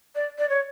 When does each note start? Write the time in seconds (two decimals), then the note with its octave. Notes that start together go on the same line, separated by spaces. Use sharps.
0.15 D5
0.38 D5
0.49 C#5